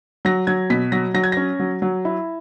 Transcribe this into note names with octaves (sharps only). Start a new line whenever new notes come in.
F#3 A#6
F#3 G#6
B2 B6
F#3 A#6
F#3 A#6
G#6
C#4 A#6
F#3
F#3
E4